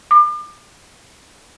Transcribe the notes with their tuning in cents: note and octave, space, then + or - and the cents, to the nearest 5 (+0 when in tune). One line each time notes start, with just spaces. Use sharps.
D6 +40